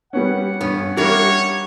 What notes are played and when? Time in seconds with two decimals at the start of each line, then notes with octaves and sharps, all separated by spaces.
0.13 G3 B3 C#4 F#5
0.61 G2 B3 C#4
0.97 G3 A#3 D4 A#4 C#5 E5